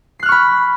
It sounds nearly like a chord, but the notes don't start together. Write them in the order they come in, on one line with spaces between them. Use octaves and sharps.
C7 F#6 F6 C#6 B5